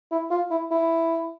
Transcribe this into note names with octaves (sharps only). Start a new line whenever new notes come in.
E4
F4
E4
E4